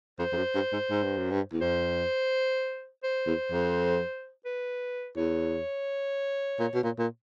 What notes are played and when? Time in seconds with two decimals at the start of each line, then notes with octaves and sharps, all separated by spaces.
0.19 F2 C5
0.33 F2
0.37 F#2
0.55 G2
0.73 G#2
0.90 G#2
1.04 G2
1.18 F#2
1.31 G2
1.52 E2
1.61 F2 C5
3.04 C5
3.27 E2
3.52 F2
4.46 B4
5.17 E2 C#5
6.60 A#2
6.74 B2
6.83 A#2
6.98 A#2